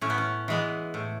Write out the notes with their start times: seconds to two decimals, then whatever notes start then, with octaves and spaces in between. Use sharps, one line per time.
0.01 A2 C#4
0.10 B3
0.18 C#4
0.48 E3 G#3 B3
0.94 A2